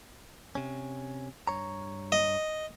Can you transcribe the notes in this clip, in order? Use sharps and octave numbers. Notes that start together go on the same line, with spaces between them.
C3 C#4
G2 C#5 A#5
D#5